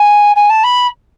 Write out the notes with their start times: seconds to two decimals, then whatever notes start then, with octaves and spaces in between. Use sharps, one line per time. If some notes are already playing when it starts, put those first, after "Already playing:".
Already playing: G#5
0.35 G#5
0.49 A5
0.63 B5